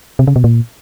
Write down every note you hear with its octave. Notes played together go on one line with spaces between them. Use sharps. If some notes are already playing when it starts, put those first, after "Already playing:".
C3
C#3
B2
A#2